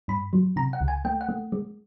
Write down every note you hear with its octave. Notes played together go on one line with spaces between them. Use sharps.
G2 B5
F#3
C3 A#5
F#5
C#2
G#5
A3 G5
F#5
A3
G#3